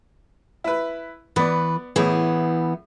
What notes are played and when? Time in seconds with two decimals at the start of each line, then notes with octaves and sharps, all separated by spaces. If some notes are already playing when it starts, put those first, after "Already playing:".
0.64 E4 B4
1.36 E3 B3 B4 D5
1.96 A2 E3 B3 G#4